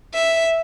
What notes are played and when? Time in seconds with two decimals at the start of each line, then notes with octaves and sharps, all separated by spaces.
0.14 E5